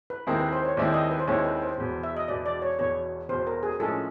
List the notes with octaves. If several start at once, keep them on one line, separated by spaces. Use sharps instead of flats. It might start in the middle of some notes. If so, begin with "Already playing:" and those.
B4
D#2 D#3 G#3 C4 E4 A#4
B4
C5
C#5
D#2 D#3 G#3 C4 E4 D5
D#5
B4
C5
D#2 D#3 G#3 C4 E4 C#5
B4
C5
E1 E2 B2
E5
D#5
E1 E2 B2 D5
D5
C#5
E1 E2 B2 C#5
E1 E2 B2 C5
A#4
G#4
A2 F3 G#3 C#4 A4